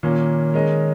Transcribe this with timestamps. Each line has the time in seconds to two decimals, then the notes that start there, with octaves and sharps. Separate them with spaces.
0.03 A#2 D#3 A#3 C#4
0.54 G#3 C#4 A#4 D#5